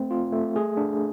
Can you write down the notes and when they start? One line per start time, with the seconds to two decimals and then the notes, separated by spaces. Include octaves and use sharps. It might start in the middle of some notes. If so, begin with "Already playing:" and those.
Already playing: A3 C4
0.11 F4
0.32 A3
0.56 G#4
0.77 D4